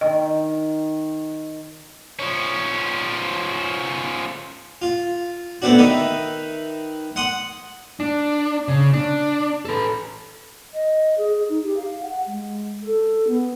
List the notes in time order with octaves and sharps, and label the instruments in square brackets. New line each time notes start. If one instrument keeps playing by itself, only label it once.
[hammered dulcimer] D#3 [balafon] D#5
[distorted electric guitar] F3 C#4
[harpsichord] F4
A3 B3 C4 D4 F#4
D#3 D#4 B4 E5
F#5 C6 D#6
[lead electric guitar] D4
C#3
D4
A4 B4
[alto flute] D#5
G#4
D#4
G4
F5
F#5
G#3
A4
B3